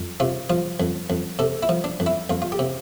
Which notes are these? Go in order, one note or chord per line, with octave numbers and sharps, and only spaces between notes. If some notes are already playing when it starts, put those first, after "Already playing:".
Already playing: F2
C3 F4
F3 F4
F2
F2
C3 A4
E4
F3
D4
F2
E4
F2 F4
F4
G4
C3